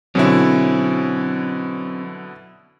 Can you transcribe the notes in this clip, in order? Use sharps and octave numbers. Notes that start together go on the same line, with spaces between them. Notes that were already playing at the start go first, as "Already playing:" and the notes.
B2 D3 F#3 C4 C#4 E4